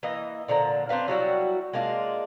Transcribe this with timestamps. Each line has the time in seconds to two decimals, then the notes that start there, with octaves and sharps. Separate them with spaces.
0.03 E3 A#3 D#5
0.48 A#2 D3 F3 A#5
0.89 C4 D4 B4 F5
1.08 F#3 G3 E4 F#4
1.73 G#3 A#3 D4 F4